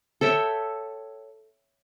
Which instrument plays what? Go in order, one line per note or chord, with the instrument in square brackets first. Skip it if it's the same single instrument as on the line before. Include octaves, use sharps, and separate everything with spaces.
[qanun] A4 C#5 E5 G5